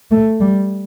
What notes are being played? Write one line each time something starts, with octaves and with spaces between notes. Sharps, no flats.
A3
G3